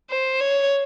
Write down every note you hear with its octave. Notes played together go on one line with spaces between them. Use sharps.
C5
C#5